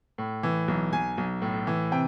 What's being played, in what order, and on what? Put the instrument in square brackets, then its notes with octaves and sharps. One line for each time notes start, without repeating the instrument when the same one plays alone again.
[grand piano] A2
E3
B1
B1 G#5
B1
A2
E3
C3 G5